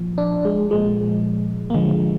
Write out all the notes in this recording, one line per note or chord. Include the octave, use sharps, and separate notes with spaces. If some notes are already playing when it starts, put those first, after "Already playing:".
Already playing: A#2 F3
D4
G#3
A#2 F3 G#3
A#3
D3 F3 G#3